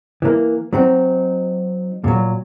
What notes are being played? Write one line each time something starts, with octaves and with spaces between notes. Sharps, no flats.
E3 A#3
F#3 C4 D#4
A#2 F#3